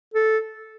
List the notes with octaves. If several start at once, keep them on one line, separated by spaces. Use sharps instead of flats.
A4